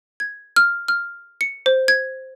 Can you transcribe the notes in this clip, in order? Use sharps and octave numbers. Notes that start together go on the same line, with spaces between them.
G#6
F6
F6
C#7
C5
G#6